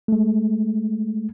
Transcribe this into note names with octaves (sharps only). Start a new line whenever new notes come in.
G#3 A3